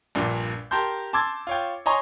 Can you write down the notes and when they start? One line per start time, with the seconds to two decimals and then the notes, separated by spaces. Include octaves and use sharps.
0.15 A#1 G2 A#2
0.71 G4 A#4 A5 C6 G6
1.13 A5 C6 D6 E6 G#6 A6
1.47 F4 C#5 G5
1.86 C#5 D#5 G#5 A#5 C6 C#6